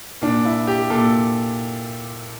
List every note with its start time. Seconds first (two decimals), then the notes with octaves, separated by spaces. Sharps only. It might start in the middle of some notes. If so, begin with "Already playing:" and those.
0.22 A#2 D4
0.45 E4
0.67 G4
0.90 A#2 A4